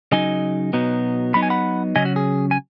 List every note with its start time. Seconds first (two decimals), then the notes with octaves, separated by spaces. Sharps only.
0.12 C#3 F#3 D#4 D#5 G#5
0.73 B2 F#3 B3 D#4
1.34 F#3 B3 D#4 B5
1.43 G#5
1.50 F#5 B5
1.96 C#3 F#3 C#4 D#5 G#5
2.05 F#4
2.16 G#4
2.51 G#5